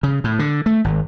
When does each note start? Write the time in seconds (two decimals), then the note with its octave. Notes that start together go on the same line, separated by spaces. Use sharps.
0.03 C#3
0.24 A2
0.39 D3
0.66 A3
0.84 G#1